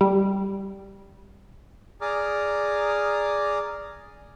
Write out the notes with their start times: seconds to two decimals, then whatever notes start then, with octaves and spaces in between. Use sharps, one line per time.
0.01 G3
2.01 G#4 D5 A#5 D6 D#6 F6